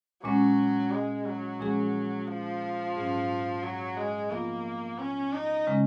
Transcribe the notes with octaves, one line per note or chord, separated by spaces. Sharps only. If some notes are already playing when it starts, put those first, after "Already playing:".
A#2 F#3 G#3 C#4
G#3
F#3
A#2 F3 G#3 C#4 G#4
F3
G#2 F#3 C#4 G#4
F#3
G#3
F3 A#3 B3 F4
C#4
D#4
C#3 G#3 C#4